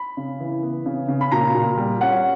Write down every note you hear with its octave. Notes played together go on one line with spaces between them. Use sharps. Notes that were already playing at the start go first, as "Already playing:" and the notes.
Already playing: B5
C#3
E3
B3
C#3
C#3
B5
A#2 A#5
A#2
G3
C#4 F#5